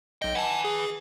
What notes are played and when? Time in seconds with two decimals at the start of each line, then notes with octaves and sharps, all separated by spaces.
0.22 B1 D#5 G5
0.35 B4 F#5 G#5 A5
0.65 G#4